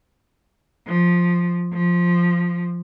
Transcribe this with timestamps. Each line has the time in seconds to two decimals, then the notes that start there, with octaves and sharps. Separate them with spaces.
0.87 F3
1.74 F3